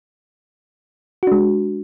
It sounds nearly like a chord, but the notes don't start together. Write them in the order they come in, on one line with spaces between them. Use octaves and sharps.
F#4 D4 G#3